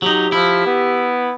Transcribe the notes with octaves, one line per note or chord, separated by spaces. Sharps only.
F#3 D#4 G4
F3 E4
B3